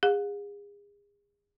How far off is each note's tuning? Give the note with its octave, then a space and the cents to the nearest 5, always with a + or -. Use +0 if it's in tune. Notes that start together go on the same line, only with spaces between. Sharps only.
G#4 -30 F5 +45